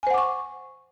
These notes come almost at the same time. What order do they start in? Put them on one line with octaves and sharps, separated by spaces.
G#5 C5 F#5 D6 C#6